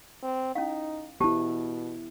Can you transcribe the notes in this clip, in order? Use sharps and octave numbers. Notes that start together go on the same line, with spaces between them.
C4
C#4 D#4 E4 F5
B2 B3 E4 G4 C5 A5